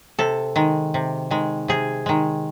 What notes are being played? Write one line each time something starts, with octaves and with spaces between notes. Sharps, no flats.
C3 A4
D#3 G#3
C3
D#3 G#3
C3 G#4
D#3 G#3